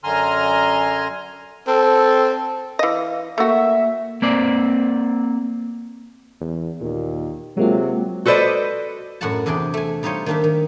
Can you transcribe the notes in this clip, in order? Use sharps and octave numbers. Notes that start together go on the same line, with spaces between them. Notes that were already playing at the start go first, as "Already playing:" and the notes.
F#2 D3 G#5 A#5 C6 F6
C4 A4
E3 D#5 F5
A3 A#3 F#4 E5
A#3 C4 D5
E2
D#2 A#2
C3 F#3 G#3 A#3 F4
F#4 A4 B4 C5 D5 D#5
F#2 A2 F#4 A#4 F#5 A5
E2 C3 D4 G#4 D5 G5
A3 G#5
G3 D#4 F4 C5 C#5 D#5
D#3 A#3 D4 G4 E5
D#3